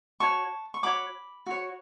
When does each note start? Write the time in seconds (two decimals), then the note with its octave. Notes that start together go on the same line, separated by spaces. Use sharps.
0.20 F#4 C#5 A5 C#6
0.74 C#6
0.83 F#4 C#5 B5 D6
1.46 F#4 C#5